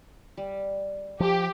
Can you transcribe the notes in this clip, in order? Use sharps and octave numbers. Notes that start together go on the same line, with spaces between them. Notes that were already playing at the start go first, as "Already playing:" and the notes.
G3
F3 G4